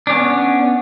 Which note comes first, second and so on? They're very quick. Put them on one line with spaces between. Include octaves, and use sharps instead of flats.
D4 C#4 B3